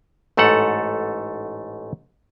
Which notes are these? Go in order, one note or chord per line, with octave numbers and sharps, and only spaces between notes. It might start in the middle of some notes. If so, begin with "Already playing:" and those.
A1 G#2 A3 A4 F#5